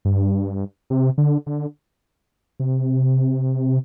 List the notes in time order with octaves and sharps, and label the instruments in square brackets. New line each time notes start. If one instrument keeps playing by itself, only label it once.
[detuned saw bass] G2
C3
D3
D3
C3